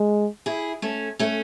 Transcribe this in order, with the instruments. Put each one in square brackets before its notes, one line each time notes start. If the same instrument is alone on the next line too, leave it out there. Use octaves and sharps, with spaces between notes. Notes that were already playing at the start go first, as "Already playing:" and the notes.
Already playing: [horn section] G#3
[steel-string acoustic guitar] E4 G#4
A3 C#4
A3 C#4